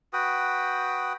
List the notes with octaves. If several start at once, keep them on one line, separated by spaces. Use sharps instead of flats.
F#4 B4 G5 D#6